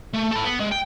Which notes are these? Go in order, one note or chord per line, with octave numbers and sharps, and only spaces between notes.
A3
A4 B5
B3
G#3
G5